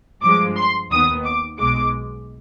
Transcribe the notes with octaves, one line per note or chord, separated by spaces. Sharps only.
G2 F3 G#3 D6
C6
D#2 D#3 B3 D#6
D6
B1 B2 G#3 D6